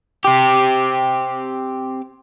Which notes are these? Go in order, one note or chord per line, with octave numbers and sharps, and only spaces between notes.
C4 G4